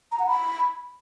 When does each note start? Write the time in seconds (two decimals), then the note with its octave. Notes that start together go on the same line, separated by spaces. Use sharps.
0.12 A#5
0.19 F#5
0.27 B5